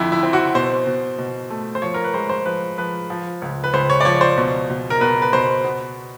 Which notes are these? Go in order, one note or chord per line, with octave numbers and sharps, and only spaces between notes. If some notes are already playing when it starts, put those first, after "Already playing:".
Already playing: F2 D3 E4
E4
C4
F#4
B2 C5
B2
B2
A3
C5
F3 C#5
A#4
B4
G#3 C5
C5
F3 B4
F3 B4
F3
C#2
B4
C#2 C5
C#5
D5
F3 C#5
C5
B2
B2
A#4
B2 B4
B4
B2 C5
B3